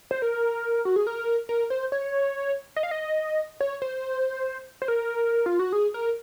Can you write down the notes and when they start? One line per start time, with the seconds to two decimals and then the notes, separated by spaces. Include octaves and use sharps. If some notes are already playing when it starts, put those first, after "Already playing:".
0.11 C5
0.22 A#4
0.85 F#4
0.96 G#4
1.07 A#4
1.49 A#4
1.70 C5
1.92 C#5
2.76 D#5
2.83 F5
2.91 D#5
3.61 C#5
3.82 C5
4.82 C5
4.88 A#4
5.46 F4
5.60 F#4
5.73 G#4
5.94 A#4